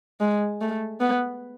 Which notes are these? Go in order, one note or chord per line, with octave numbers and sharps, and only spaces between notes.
G#3
A3
B3